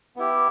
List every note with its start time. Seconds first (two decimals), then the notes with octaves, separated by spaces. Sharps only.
0.16 B3 E4 G4